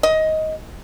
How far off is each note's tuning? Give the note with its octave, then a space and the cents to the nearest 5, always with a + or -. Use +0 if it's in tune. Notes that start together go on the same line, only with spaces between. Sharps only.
D#5 +15